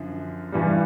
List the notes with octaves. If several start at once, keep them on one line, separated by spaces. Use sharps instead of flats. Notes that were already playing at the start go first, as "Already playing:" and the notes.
Already playing: F#2 D3 F3
G2 E3 G3